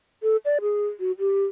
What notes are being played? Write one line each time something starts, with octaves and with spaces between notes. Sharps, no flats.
A4
D5
G#4
F#4
G4